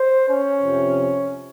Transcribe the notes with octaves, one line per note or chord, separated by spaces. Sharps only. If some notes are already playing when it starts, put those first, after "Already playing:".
Already playing: C5
C#4
F2 C3 F3